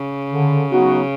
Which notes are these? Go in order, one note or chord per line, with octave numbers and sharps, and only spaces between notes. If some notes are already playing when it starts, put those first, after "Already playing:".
Already playing: C#3
D3
F#3 B3 D#4 F#4